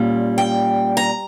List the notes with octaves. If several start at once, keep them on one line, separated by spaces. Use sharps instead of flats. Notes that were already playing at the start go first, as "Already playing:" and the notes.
Already playing: A#2 G3 A#3 C#4
G5
A#5